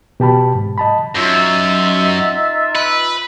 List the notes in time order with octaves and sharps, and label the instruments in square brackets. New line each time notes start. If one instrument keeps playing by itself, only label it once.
[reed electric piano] B2 G4 A5 B5
G#2
D#5 A5 B5
[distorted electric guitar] F#2 [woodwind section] D#4 F4 E5
[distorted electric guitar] B4